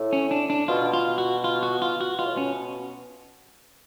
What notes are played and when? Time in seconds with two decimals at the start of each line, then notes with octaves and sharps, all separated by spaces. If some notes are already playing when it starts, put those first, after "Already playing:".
Already playing: A2
0.13 C#4
0.31 D4
0.50 D4
0.68 B2 F4
0.93 F4
1.18 F#4
1.44 F4
1.63 F#4
1.82 F4
2.01 F#4
2.19 B2 F4
2.26 A2
2.33 B2 C#4